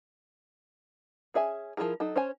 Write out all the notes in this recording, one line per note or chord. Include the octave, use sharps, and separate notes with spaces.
C#4 G#4 E5 G#5
F3 B3 E4 G#4 A#4
F#3 D#4 A4
C#4 C5 C#5 G#5